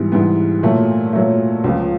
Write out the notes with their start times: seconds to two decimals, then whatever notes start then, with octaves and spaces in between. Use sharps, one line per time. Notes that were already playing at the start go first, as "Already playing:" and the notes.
Already playing: G#2 E3 G3 B3
0.12 G#2 E3 G3 B3
0.63 A#2 F#3 A3
1.13 A#2 F#3 A3
1.64 C#2 C#3 F3